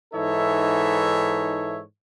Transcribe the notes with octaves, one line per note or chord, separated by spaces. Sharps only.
G#2 E3 D#4 A4 C#5 E5